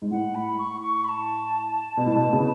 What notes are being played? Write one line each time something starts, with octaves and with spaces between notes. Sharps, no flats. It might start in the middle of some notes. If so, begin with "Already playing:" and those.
G#2
A2 F#5
B5
C#6
C#6
B5
A5
B2
A2
B2
C#3